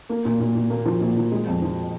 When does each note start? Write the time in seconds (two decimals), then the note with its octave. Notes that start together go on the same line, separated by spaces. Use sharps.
0.09 A#3
0.25 A#2
0.40 A#2
0.55 A#2
0.70 A#3
0.85 F3
1.01 A#2
1.17 F3
1.32 G#3
1.47 F2
1.62 F3